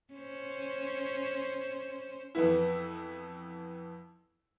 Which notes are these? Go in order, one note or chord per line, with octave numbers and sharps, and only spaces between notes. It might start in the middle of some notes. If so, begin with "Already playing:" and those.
C#4 C5
F2 E3 B3 E4